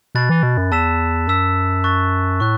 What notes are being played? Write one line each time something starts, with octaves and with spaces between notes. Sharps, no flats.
B2 B5 F#6 A6
E3
B2
F#2
E2 A5 E6 B6 E7
F#2 A5 E6 B6 E7
C#6 F#6 A6
A2 C#6 F#6